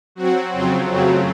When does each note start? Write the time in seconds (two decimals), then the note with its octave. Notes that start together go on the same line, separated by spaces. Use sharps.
0.15 F#3 C4 F#4
0.52 F2 C#3 F#3 C4 F4
0.88 F#2 C#3 F#3 A3 C4